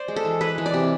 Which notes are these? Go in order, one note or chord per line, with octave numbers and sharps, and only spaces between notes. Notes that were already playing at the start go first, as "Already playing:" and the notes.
Already playing: C5 D5
G#3
A4
E3
G#3 B4
E3
D5
C3